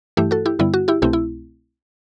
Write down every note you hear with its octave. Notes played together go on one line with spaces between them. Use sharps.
G2 E3 A3 E4 G4
F#4 A4
E4 G4
G2 D3 G3 B3 E4
F#4
E4 G4
C2 B2 A3 C4 E4 G4
E4